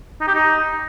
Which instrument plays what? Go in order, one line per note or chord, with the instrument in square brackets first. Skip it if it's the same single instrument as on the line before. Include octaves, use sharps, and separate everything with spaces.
[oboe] D#4
G4
D#4